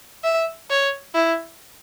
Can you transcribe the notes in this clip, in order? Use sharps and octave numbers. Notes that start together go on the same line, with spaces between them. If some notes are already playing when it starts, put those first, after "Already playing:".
E5
C#5
E4